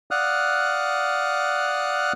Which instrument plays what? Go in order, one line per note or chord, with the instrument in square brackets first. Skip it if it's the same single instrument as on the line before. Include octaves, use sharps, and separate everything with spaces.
[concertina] D5 F5 F#5 D#6 F6 F#6